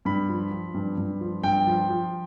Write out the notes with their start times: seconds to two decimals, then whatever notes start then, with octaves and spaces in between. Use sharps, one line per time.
0.05 G2 B5
0.29 F3
0.51 F3
0.74 G2
0.98 G2
1.21 F3
1.43 G2 G5
1.67 F3
1.90 F3